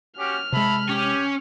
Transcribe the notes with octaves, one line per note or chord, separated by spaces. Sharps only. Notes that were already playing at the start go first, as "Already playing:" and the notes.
C#4 F#4 G4 F6
C3 G#3 E5 A5 B5
C#4 G4